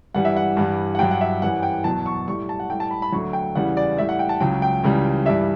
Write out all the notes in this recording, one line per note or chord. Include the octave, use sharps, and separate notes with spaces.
G2 E3 G3 F#5
E5
F#5
G2 E3 G3
F#5
G2 F#3 G5
F#5
E5
F#2 E3 G3 F#5
G5
E2 B2 F#3 A5
C#6
A2 G3 C#6
A5
F#5
A2 G3 G5
A5
B5
B5
D2 D3 F#3 C#6
G5
E2 C#3 E3 G3 F#5
D5
A2 G3 E5
F#5
G5
A5
C#2 C#3 F#3 G5
G5
C#2 C#3 E3 G3
G2 E3 G3 E5